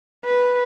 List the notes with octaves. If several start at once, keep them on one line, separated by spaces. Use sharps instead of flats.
B4